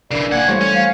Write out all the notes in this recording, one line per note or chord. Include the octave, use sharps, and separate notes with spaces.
G#1 C#3 E3 D4 A#4 D5
G2 A#3 F#5 G#5
E3 G3 A3 C5 C#5
C#4
F5